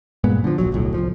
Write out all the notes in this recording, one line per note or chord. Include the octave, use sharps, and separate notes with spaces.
G2 A#2 G#3 B3
D3 F3
D1 A#1 F#3
D1 B1 A2
C2 F3